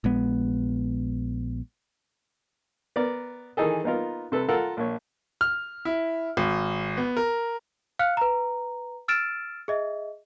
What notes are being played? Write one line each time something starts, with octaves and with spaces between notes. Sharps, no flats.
A#1 G#3 B3
B3 A#4 D5
D#3 E3 D#4 G#4 A4
A#3 B3 D#4 F4 A#4
C3 A4 B4
F4 A4 A#4 F#5
A#1 C#5
F6
E4
G#1
B3
A#4
F5 F6 F#6 C#7
B4 A#5
E6 F6 A6 D7 E7
G#4 D#5 E5